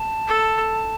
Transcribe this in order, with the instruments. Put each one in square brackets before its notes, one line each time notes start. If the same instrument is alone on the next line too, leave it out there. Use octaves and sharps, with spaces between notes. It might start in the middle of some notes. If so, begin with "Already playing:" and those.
Already playing: [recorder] A5
[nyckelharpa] A4